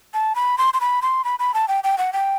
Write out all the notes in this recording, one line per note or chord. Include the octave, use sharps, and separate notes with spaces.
A5
B5
C6
C6
B5
C6
B5
B5
A5
G5
G5
F#5
G5